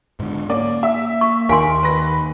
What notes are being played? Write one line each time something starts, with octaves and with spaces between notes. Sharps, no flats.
G#2 D3
A#3 C#4 D5
E5
C#6
D#2 D#3 A#4 F5 G#5 C6
B4 A#6